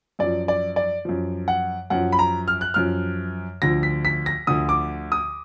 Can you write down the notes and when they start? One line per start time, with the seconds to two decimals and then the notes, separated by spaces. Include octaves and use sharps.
0.19 F#2 F3 D5
0.48 D5
0.76 D5
1.05 F#2 F3
1.48 F#5
1.90 F#2 F3 F#5
2.12 B5
2.19 A#5
2.48 F6
2.61 F#6
2.74 F#2 F3 F6
3.62 D2 D3 F3 A#6
3.83 B6
4.05 B6
4.26 A#6
4.47 D2 D3 F3 D#6
4.69 D6
5.12 D#6